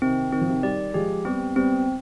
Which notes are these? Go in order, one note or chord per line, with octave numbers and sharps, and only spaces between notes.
C3 D#3 C4
D#3 C4
F3
C3 D#3
D#3 G3 D5
F3 G#3 G4
G3 B3 C4
G3 B3 C4